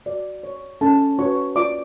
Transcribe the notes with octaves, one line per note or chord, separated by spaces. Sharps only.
F#4 D5
C#5
C#4 A4 A5
F#4 B4 C#5 C#6
F4 D5 D6